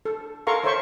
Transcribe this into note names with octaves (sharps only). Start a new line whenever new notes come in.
A4
A4 A#4 F5 A#5 C6 C#6
A4 C5 C#5 E5 C6 C#6